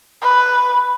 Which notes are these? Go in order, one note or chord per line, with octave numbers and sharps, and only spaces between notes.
B4